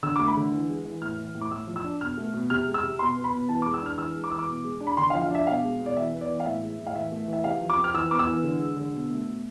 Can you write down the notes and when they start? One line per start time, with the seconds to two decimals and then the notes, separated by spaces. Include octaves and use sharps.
0.03 D3 E6
0.16 A3 D6
0.27 B5
0.37 D3
0.52 E3
0.69 G#3
0.85 E3
1.01 A2 F6
1.18 E3
1.35 A2
1.41 D6
1.51 A2 E6
1.67 F3
1.76 E6
1.84 D4
2.01 B2 F6
2.17 A3
2.34 B2
2.50 C3 F6
2.67 G#3
2.74 E6
2.83 C3
2.99 B2 C6
3.17 B3
3.24 B5
3.33 B2
3.49 E3 A5
3.62 G#3 D6
3.74 E6
3.82 D4 F6
3.98 E3 E6
4.16 G#3
4.24 D6
4.31 E3 E6
4.39 D6
4.48 B2
4.64 G#3
4.80 D4
4.87 B5
4.97 D3 C6
5.10 F5
5.15 F3
5.22 F5
5.31 D4 E5
5.47 B2 F5
5.64 G#3
5.80 B2
5.86 D5
5.96 E3 E5
6.12 B3
6.21 D5
6.29 E3
6.40 F5
6.45 A2 E5
6.63 G#3
6.79 A2
6.87 F5
6.95 E3 E5
7.12 A3
7.28 E3 E5
7.44 C3 F5
7.61 F3
7.70 D6
7.77 C4
7.84 F6
7.94 E3 E6
8.11 B3 D6
8.19 E6
8.27 E3
8.44 D3
8.60 G#3
8.77 D3
8.93 B2
9.10 A3
9.26 B2